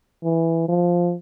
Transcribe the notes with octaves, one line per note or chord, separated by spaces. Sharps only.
E3
F3